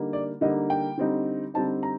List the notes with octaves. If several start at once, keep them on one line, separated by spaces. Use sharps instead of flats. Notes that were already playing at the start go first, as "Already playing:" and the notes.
Already playing: D3 G3 A#3 D#4
D5
D3 G3 A#3 D#4 D#5
G5
D3 G3 C4 D#4
D3 G3 C4 D#4 A5
A#5